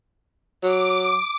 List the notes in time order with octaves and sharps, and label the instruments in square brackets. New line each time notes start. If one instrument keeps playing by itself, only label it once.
[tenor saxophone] F#3 [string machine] D6